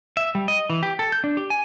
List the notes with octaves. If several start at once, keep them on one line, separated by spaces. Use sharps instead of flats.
E5
G3
D#5
E3
G4
A4
G6
D4
G4
G#5